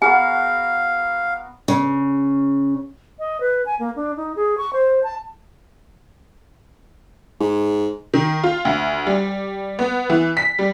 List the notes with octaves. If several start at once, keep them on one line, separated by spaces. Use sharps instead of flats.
B3 F#4 G#4 A#4 F5 G#5
C#3
D#5
B4
G#5
A#3
D4
D#4
G#4
C#6
C5
A5
G#2
D#3
F4
D2
G3
B3
E3
B6
G3